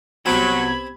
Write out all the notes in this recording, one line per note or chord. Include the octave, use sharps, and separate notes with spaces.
C2 F#3 B3 C4 G4 B5 G#6